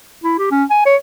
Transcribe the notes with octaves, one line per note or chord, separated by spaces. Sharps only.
E4
G4
C#4
G#5
C#5